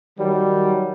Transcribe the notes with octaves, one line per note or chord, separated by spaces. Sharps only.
D#3 F#3 G3